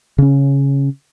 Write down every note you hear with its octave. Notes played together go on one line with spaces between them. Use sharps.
C#3 C#4